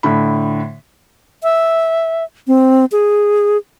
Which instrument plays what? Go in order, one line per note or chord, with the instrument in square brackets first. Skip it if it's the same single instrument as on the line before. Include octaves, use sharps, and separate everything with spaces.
[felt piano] A2 D3 B5
[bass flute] E5
C4
G#4